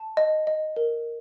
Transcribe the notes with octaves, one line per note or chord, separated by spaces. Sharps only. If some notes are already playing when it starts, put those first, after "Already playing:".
Already playing: A5
D#5
D#5
A#4